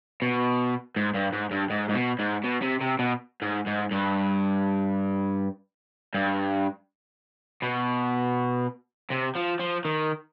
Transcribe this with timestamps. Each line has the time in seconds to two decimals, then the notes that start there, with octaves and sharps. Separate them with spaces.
0.22 B2
0.96 G#2
1.14 G2
1.33 G#2
1.51 G2
1.70 G#2
1.89 G#2
1.94 B2
2.19 G#2
2.44 B2
2.62 C3
2.81 C3
2.99 B2
3.42 G#2
3.67 G#2
3.92 G2
6.14 G2
7.62 B2
9.10 C3
9.35 F3
9.59 F3
9.85 D#3